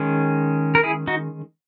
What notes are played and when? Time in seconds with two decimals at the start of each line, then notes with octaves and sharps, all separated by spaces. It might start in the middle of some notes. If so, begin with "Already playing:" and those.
Already playing: D#3 G#3 C#4
0.75 A#4
0.83 E4 G#4
1.07 D#4 F#4